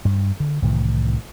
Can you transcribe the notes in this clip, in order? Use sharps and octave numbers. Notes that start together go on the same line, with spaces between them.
G2
D3
C2 A2 D#3 E3